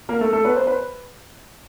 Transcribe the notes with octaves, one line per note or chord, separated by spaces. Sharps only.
A#3 A#4
A3 A4
A3 A4
B3 B4
C5
B4